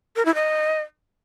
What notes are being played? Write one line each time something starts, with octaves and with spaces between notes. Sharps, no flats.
A#4
E4
D#5